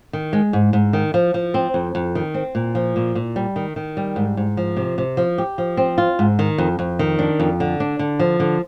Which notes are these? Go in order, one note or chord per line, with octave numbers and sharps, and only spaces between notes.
D#3
G#3
G#2
G#2
D#3
F3
F3
C4
F2
F2
D#3
C4
A#2
F3
A#2
A#2
G3
D#3
D#3
G3
G#2
G#2
F3
C3
C3
F3
G4
F3
C4
F4
G#2
D#3
F2
F2
D#3
D4
F2
D3
D4
D3
F3
D3